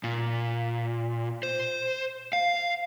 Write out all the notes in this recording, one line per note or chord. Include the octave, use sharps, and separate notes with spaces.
A#2
C5
F5